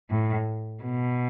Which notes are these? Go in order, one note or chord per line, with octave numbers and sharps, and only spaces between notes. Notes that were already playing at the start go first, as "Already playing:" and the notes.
A2
B2